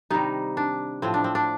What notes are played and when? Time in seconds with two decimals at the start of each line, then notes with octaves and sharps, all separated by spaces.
0.10 C3 D#3 G3 D#4
0.57 D4
1.02 A2 F3 C4
1.14 D4
1.24 C4
1.35 D4